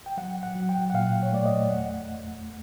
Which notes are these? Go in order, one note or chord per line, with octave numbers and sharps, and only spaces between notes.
G5
F#3 F#5
F#5
F#3
G5
F#5
A#2 F5
C#5
A3 D5
D#5
E2 F#5
E2